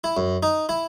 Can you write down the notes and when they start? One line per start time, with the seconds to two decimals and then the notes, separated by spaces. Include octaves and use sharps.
0.04 E4
0.17 F#2
0.43 D#4
0.69 E4